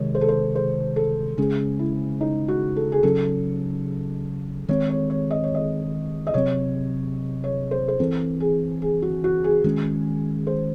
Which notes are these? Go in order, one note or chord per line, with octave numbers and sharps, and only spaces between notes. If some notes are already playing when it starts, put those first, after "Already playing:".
Already playing: C3 D#3 G#3 C#5
C5
A4
C5
C5
A4
C#3 G#3 C#4 G#4
E4
D#4
F#4
A4
G#4
C#3 F#3 C#4 A4
D#3 G#3 C4 C#5
C#5
C#5
D#5
C#5
D#5
D#5
C3 F#3 C4 C#5
C#5
C5
C5
E3 C4 A4
G#4
G#4
F#4
F#4
G#4
D#3 G#3 C#4
C5